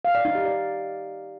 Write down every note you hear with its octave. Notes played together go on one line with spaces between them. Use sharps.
F5
D5
D#4
G4
D5